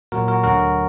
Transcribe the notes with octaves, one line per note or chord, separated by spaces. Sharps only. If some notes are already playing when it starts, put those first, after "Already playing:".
A#2 F#3 F#4 A#4
F#4 A#4
D2 D3 F#3 F#4 A#4